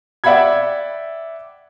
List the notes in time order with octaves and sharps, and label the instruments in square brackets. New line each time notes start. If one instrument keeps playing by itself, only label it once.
[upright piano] D5 E5 F#5 G5 B5 G#6